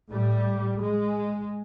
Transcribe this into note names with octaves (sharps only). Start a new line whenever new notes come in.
A2 G3
G#3